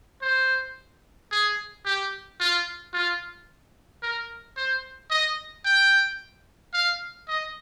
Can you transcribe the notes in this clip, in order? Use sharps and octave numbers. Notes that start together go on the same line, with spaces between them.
C5
G#4
G4
F4
F4
A#4
C5
D#5
G5
F5
D#5